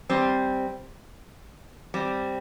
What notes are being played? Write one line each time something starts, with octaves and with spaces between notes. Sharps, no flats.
G3 C4
G3 C4